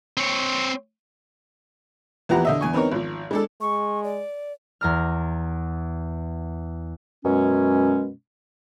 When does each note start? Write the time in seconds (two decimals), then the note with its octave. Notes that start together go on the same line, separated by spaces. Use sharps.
0.17 C4 C#5
2.29 E2 E3 F3 G4 F#5 A#5
2.45 D3 D#5 E5
2.61 E2 G#5 C#6
2.73 B3 C4 D#4 A#4 C#5
2.92 G#1 F3
3.31 G#3 D4 A4
3.61 G#3 C#6
4.04 D5
4.81 E2 A#5 F6
7.25 F#2 B2 G#3 C#4